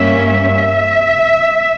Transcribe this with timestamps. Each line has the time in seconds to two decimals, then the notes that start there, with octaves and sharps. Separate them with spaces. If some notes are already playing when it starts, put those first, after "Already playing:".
Already playing: G2 G3 A#3 C#4 E5
0.31 E5